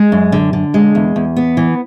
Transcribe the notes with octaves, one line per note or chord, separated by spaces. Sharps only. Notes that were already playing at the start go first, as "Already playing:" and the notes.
Already playing: G#3
F#2
D3
D3
G#3
E2
E2
B3
E3